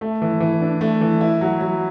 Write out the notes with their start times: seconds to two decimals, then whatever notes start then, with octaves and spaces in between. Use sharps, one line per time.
0.01 A3
0.22 E3
0.40 E3
0.61 D4
0.81 A3
1.01 E3
1.21 E4
1.41 F#3
1.61 F#3